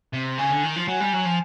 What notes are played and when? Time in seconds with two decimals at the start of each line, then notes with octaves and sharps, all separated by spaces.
0.14 C3
0.38 C#3 G#5
0.51 D3
0.64 D#3
0.76 F3
0.88 F#3 G#5
1.00 G3
1.13 F#3
1.26 F3